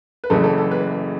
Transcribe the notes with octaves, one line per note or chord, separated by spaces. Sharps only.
B4
F#1 F#2 C#3 E3 A3 A4
A4
A4
B4